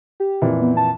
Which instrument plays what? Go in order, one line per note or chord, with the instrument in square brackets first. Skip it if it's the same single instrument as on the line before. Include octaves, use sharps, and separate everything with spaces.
[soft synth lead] G4
[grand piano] F2 A#2 E3
[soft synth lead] B3
A5